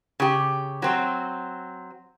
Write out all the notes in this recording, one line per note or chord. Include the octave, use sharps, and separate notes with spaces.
C#3 G4
F#3 C4